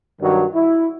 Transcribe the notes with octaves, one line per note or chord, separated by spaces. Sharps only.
G2 D#3 F#3
E4